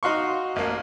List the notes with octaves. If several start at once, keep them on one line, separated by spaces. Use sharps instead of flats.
D#4 F#4 F5 C6 C#6
A1 A#3